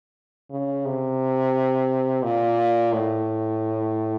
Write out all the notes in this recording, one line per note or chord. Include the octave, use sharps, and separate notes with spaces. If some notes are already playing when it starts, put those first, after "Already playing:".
C#3
C3
A#2
A2